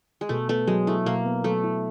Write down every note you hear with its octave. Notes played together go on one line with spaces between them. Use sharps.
G#3
B2 A3
A3 B3
F#3 G#3
A3 E4
B2 A#3
B3
F#3 A3
E4